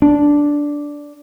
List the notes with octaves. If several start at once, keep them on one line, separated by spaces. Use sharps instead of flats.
D4